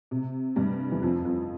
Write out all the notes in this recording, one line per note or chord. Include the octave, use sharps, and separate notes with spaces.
C3
G2 G3
E2 E3
F2 F3
F2 F3